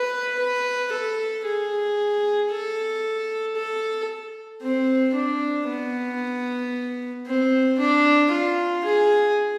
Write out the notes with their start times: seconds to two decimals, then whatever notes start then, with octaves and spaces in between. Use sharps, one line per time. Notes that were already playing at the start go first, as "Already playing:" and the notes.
Already playing: B4
0.39 B4
0.93 A4
1.45 G#4
2.50 A4
3.56 A4
4.62 C4
5.14 D4
5.68 B3
7.26 C4
7.78 D4
8.32 F4
8.85 G#4